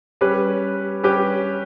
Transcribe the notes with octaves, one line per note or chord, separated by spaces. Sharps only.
G3 C#4 G4 B4
G3 C#4 G4 B4